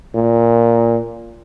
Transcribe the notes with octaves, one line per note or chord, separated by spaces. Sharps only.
A#2